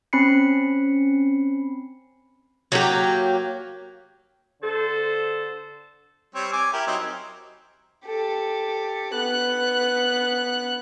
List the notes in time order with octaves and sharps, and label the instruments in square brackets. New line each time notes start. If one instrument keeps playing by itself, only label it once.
[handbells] C4 C#4 B5 C7 C#7
[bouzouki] F#3 A#3 G4
[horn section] D3 A4 C5
[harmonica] G3 C4 C#5
G#5 D6
E4 G4 A#4
F#3 C4 D#4
[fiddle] G4 A4
B3 F#6